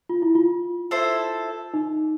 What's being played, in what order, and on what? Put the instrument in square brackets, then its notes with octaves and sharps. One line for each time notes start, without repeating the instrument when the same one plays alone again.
[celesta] F4
E4
F4
[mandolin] E4 A4 C5
[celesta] D#4